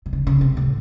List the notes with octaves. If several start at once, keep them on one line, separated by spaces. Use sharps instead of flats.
C3
C#3
C#3
C3
A2